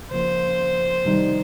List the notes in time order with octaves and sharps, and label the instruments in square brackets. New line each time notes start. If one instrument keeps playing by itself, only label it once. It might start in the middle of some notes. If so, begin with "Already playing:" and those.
[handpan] C#3 F3 A#3 [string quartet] C5
[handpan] C3 D#3 G3 C4 D#4